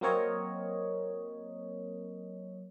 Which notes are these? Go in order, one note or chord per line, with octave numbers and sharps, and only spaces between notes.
F#3 A#3 C4 A#4 C#5 D#5